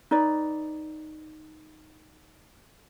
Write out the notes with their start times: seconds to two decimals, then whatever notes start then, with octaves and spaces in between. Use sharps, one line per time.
0.11 D#4 B4 D5